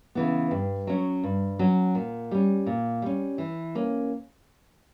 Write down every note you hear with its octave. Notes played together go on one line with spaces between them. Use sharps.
C#3 E3 B3
G2
F#3 C#4
G2
F#3 C#4
A#2
G3 C#4
A#2
G3 C#4
E3
A#3 C#4